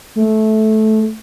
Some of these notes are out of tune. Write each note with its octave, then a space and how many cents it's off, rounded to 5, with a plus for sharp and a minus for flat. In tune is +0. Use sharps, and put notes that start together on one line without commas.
A3 -15